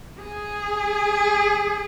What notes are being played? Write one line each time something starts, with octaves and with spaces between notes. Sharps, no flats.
G#4